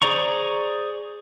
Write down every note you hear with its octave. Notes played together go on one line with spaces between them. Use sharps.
G#4 C5 D5 A#5 C#6